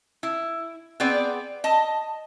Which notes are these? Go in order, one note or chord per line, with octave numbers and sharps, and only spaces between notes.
E4
B3 C4 G#4 D5
D#5 A5